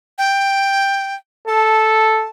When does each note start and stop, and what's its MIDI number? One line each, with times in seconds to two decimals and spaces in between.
0.18 1.15 79
1.48 2.26 69
1.48 2.30 81